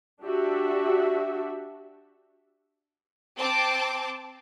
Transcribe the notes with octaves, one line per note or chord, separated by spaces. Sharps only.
D4 F#4 G4 E5
C4 A5 D6